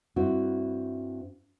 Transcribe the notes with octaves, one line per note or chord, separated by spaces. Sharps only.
G2 C4 E4 F#4